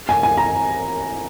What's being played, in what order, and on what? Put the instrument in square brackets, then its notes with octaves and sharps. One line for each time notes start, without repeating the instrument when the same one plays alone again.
[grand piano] G#5
G#5
A#5